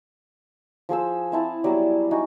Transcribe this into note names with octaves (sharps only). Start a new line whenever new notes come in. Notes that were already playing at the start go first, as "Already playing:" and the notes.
F3 G#4 C5 E6
C4 E4 A5
F#3 G3 B3 D5
D#4 F#4 G#5 C#6